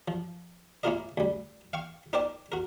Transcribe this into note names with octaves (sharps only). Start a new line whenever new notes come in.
F3
A#3 C#4 E4 F4 A#4 D#5
D2 G3
F5 G5 C#6
D#4 A#4 C5 D5 G5 A5
F#4 A#4